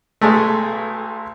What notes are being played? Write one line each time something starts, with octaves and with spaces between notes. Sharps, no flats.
B1 G#3 A3